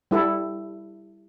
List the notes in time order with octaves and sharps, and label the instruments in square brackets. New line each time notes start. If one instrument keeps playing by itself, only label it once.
[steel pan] G3 E4 A4